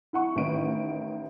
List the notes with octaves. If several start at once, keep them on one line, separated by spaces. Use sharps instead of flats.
E4 F#5 C#6
A1 D#3 D#4 D7